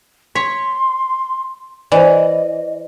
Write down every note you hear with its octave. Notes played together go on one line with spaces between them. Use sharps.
C#5 C6 B6
E3 C5 D5 D#5